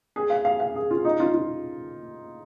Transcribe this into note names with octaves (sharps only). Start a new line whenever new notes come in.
G#4
F5
F5
F5
G#4
F4
D#4
F4
F4